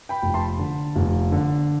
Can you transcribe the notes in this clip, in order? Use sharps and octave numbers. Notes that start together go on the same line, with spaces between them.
G5 B5
F1
A5 C6
D3
F1
D3